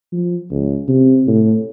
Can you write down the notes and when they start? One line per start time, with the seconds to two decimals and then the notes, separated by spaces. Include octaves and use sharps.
0.12 F3
0.51 C#2
0.88 C3
1.27 A2